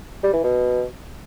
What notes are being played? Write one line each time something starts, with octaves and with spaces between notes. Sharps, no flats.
G3
E3
B2